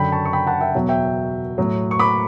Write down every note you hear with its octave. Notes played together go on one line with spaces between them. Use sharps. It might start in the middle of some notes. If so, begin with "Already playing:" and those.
Already playing: F#2 D3 F#3 G5 B5
A5 C#6
C#6
G5 B5
F#5 A5
E5 G5
E2 B2 F#3
E5 G5
A2 F#3
C#6
B5 D6